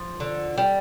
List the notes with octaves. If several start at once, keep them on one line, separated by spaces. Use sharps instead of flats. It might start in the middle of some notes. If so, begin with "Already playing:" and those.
Already playing: F3
D3
G3